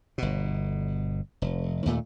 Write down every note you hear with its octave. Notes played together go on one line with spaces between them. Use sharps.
G1 B2
F1
D#2 A#2 A3